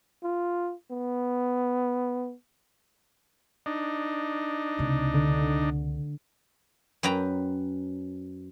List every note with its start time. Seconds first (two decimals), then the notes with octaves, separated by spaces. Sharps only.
0.24 F4
0.91 B3
3.66 D4 D#4
4.79 C#2 C3
5.14 D3
7.03 F#2 B4 G5 A#5